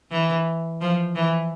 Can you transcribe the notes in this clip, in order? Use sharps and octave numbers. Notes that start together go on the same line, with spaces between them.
E3
F3
E3